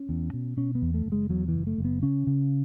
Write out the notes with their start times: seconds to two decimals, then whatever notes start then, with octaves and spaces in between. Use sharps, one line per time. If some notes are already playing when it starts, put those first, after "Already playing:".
Already playing: C#4
0.09 E2
0.33 B2
0.57 B2 C#4
0.75 B3
0.82 E2
0.94 A3
1.06 F#1
1.12 G#3
1.30 E2 F#3
1.48 E3
1.54 F#1
1.67 A3
1.78 F#1
1.85 B3
2.03 C#3 C#4
2.27 C#3